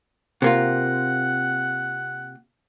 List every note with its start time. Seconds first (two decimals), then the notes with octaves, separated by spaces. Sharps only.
0.42 C3 A#3 F4 F#5